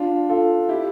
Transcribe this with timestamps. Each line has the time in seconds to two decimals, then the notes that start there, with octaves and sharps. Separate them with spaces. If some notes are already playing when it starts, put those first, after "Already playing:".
Already playing: D4 F4
0.29 F4 A4
0.69 E4 G4